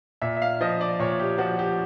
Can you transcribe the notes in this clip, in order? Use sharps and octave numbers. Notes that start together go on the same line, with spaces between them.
A#2 E5
E5
F5
F3 D#5
D5
A#2 C#5
G4
F3 F#4
G4